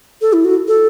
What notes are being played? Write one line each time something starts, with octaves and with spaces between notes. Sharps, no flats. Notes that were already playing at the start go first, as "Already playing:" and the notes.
A4
E4
F#4
A4